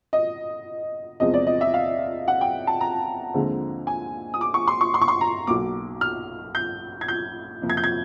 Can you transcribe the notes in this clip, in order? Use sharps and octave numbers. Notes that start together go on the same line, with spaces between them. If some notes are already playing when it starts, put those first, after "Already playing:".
D#5
E2 C3 F3 G#3 C4 D#5
D5
D#5
E5
F5
F#5
G5
A5
A#5
D#2 D3 F3 G#3 C4
G#5
D#6
D6
C#6
C6
C#6
C6
C#6
C6
A#5
B1 B2 F#3 A#3 D6
F6
G6
G#6
G6
F2 C3 F3 A#3
G#6
G6
G#6